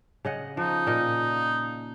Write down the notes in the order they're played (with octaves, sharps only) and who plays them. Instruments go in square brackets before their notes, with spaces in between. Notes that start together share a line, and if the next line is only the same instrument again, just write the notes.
[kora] C#3 D#5 F#5
[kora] F3 [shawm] D#4
[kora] A#2 D#5